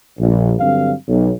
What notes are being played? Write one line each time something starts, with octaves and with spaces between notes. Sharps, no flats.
A#1
G2 D3 F#3 C4 F5
B1